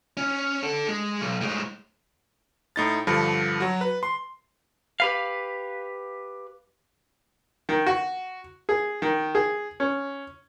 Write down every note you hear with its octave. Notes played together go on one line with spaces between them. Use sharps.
C#4
D4 A4
G#3
B1
A2 G#3
A2 D#4 A6
G2 D3 F3
F#3 F#4
B4
C6
G4 B4 F5
D#3
F#4
G#4
D#3
G#4
C#4